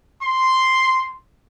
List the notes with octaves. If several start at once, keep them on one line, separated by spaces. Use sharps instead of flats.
C6